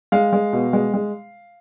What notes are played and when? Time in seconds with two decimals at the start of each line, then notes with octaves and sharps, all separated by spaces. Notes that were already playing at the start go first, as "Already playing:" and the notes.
0.12 G#3 F5
0.33 G#3
0.53 B2
0.73 G#3
0.94 G#3